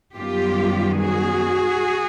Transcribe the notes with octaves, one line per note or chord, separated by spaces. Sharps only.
F#2 D#3 G3 B3 F4 G4
F#4 G#4